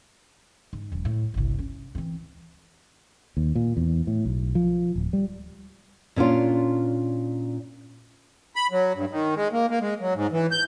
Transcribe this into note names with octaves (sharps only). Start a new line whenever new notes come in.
G#2
E1 F#3
A2
G1 C2
C#4
E3 C4
D#2
A#2
E2
A2
B1
F3
D1
G3
A#2 C#4 D4 F4
B5
F#3
G2
D#3
G#3
A#3
A#3
G#3
F#3
G#2
E3
G6